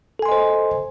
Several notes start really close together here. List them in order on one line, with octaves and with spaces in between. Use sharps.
A4 G#5 C6 D#5 C5